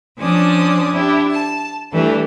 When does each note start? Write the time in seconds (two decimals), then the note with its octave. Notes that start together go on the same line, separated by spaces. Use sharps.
0.19 F3 C#4 D4 D5 D#6
0.93 D4 E4 G4
1.31 A5
1.92 E3 G3 A3 D4